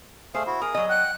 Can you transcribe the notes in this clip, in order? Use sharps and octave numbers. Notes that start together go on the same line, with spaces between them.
A3 G#4 C5 F5
E4 F#4
G#4 A#4 D#6
F#3 D#5
F#5 G5 F#6